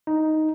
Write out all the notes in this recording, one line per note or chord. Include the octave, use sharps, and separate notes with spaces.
D#4